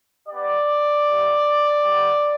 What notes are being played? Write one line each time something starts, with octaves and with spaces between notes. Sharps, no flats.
B3 G4 D5
B3 E4 G4
B3 G4